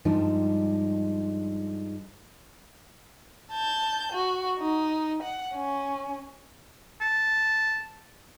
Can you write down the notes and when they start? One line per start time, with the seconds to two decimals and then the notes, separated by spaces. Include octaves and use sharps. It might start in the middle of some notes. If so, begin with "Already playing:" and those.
0.05 G2 F3 G3 G#3 D4 D#4
3.53 A5 G6
4.12 F#4
4.60 D#4
5.23 F#5
5.55 C#4
7.01 A5